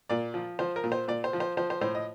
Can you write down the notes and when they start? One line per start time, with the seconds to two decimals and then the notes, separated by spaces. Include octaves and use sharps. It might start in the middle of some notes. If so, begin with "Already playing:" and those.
0.09 A#2 D5
0.34 F3
0.59 F3 C5
0.76 A#4
0.84 A#2
0.92 C5
1.08 A#2 D5
1.24 C5
1.33 F3
1.40 C5
1.57 F3 C5
1.70 C5
1.81 A2 C5
1.95 D#5